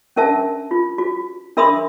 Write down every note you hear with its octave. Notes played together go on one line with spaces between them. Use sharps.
C#4 D4 A#4 E5 A5
F4
F#4
D4 A#4 E5 B5 C6 D#6